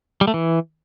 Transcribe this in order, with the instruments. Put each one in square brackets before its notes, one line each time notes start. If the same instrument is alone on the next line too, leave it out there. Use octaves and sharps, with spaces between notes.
[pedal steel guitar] G3
A3
E3